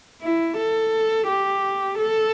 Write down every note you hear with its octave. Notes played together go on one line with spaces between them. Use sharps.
E4
A4
G4
A4